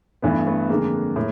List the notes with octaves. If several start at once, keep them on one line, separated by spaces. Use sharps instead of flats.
G2 E3 A3 B3
A3 B3
F2 D3 G#3 A#3
A2